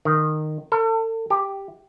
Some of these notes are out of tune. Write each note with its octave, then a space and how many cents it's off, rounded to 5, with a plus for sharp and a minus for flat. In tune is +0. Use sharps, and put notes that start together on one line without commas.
D#3 -15
A4 +40
G4 +5